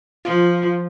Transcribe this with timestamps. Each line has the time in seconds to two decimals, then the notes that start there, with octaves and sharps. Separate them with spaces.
0.25 F3 F4